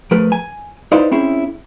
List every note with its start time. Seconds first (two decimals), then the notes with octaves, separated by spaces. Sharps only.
0.11 F3 A3 G#4 A#4 B4
0.32 G#5
0.92 D#4 E4 B4 C5 D5 F5
1.11 C4 C#4 E4 G#4